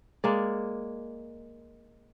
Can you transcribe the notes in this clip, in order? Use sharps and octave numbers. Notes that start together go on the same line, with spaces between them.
G#3 A#3 D5